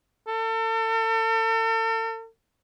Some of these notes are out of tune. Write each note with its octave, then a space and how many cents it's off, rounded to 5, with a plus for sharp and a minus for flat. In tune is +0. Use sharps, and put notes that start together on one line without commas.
A4 +40